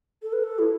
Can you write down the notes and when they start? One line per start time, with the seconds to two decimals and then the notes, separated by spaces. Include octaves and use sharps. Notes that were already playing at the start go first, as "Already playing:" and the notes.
0.22 A4
0.33 B4
0.44 A4
0.59 E4